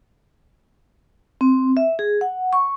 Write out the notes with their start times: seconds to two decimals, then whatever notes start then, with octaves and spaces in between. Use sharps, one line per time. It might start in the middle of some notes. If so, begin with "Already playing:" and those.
1.41 C4
1.77 E5
1.99 G#4
2.21 F#5
2.53 C#6